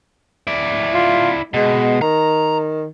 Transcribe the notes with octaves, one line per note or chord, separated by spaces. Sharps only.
E4 D5
F4
B2 G#3
D#3 A#5